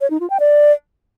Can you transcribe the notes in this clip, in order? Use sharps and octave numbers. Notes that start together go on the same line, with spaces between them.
C#5
D#4
F4
G5
D5